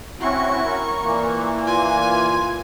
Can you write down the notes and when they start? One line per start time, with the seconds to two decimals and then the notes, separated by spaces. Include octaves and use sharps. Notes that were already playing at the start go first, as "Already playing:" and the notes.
0.20 C4 C#4 E4 F#4 C#6
0.64 A#4
1.03 A#2 E3 A#3
1.67 F4 G#5